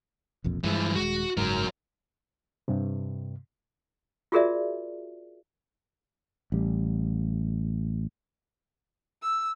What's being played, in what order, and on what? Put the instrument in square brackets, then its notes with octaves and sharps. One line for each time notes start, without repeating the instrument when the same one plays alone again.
[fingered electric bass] E1 A#1 F2
[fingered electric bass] G2 G#3 [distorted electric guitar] E3 F3
[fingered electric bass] D#1 G#3 [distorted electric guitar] F#4
[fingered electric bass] F#1 G#2 [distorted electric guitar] F#3 A#4
[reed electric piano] G2 C3
[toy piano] F4 F#4 G#4 A#4 D5 E5
[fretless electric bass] A1 G3
[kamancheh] E6